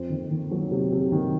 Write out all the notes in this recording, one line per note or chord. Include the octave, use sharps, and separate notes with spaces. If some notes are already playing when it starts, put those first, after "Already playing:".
Already playing: F2 C5
D#3
D#3
F#3
C3
C3
D#3